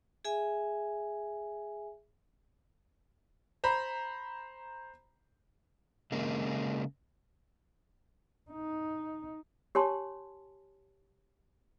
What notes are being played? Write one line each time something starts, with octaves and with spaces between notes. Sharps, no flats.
G#4 E5 G#5
C5 A#5 B5
C#3 G#3 A#3
D#4
G4 C#5 G#5 A5 C6